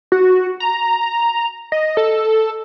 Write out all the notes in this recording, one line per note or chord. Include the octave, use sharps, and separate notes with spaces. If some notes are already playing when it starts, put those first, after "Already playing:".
F#4
A#5
D#5
A4